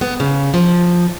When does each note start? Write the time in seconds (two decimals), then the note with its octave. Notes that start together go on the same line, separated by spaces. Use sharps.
0.01 B3
0.20 C#3
0.54 F3